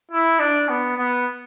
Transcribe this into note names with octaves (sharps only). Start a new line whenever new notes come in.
E4
D4
B3
B3